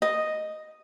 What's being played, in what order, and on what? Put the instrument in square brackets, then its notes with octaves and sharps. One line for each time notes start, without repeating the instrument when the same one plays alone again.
[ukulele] D#5